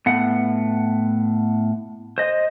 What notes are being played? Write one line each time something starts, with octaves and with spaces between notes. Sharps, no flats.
A2 B3 F#5
C5 D#5